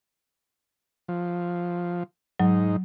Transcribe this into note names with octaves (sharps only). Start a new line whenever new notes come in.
F3
G#2 F#3 D#4